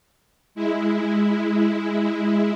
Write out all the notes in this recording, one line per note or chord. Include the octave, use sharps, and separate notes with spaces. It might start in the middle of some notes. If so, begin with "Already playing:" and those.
G#3 E4